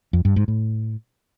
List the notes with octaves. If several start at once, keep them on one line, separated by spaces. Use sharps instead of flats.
F2
G2
G#2
A2